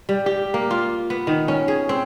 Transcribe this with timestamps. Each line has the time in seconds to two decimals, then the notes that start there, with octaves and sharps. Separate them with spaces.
0.09 G3
0.26 G4
0.54 A#3
0.71 F4
1.10 B3
1.27 D#3
1.48 C#4
1.68 G#4
1.89 C4